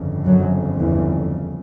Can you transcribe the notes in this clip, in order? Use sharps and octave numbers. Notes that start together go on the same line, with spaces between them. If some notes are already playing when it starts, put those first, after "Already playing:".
Already playing: G1 F2 C#3
F#2 F#3
E2 E3